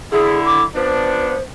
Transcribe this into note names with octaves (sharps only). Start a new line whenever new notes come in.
D3 E4 G#4
D6
F3 B3 D4 C5